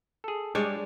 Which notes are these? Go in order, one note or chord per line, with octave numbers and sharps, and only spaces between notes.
G#4 A4
G3 G#3 D4 C#5